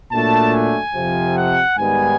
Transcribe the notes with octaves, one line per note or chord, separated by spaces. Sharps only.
A#2 F#3 A3 D4 A5
G#5
F2 C3 F3
F#5
G#2 D#3 G3 B3 G#5